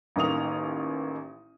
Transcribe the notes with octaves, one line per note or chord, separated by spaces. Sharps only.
A1 D#3 A#3 D#6 F7